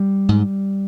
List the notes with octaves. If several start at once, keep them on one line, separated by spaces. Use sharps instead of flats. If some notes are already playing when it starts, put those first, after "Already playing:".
Already playing: G3
G#2